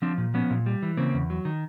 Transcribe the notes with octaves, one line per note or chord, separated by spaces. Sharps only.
F3 C4 D4
A#2
F3 B3 C#4
A#2
G3
E3
C#3 A#3 C4
E2
F#3
D#3